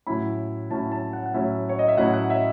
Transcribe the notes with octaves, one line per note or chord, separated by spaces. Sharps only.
A2 F#3 C#4 E4 B5
A2 F#3 C#4 E4 A5
A5
F#5
F#5
A2 F#3 C#4 E4 E5
C#5
D#5
E5
A2 F#3 C#4 E4 F#5
F#5
E5